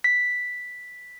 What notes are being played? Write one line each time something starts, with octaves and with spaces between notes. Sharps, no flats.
B6